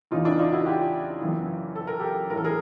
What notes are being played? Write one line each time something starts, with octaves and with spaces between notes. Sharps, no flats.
E2 C#3 E3 D#4 F4
D4 E4
D#4 F4
E4 F#4
F4 G4
F#2 C#3 E3
A4
A#4
G4 A4
A2 E3 A4 A#4
G#4 A#4